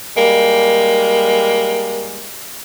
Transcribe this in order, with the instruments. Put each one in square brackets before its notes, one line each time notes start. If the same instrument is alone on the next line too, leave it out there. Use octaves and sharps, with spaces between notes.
[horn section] G3 G#3 A#3